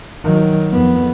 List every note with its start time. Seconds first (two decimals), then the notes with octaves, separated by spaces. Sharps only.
0.24 D#3 F#3
0.70 F2 B3